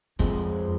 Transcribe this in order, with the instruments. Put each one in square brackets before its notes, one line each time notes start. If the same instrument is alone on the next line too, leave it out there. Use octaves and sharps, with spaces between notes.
[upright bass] F2 [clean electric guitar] F3 G#3 C4